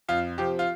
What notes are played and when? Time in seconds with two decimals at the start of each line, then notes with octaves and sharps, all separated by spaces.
0.08 F2 F4
0.38 C3 F3 G4
0.59 F4